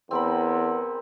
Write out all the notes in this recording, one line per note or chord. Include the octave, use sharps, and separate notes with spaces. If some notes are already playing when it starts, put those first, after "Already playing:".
E2 C4 A#4 B5